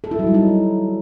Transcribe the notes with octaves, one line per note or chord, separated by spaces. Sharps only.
A4
E4
F#3
G3
D#4